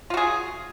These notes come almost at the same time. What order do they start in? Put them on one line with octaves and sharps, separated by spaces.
F4 F#4 G#4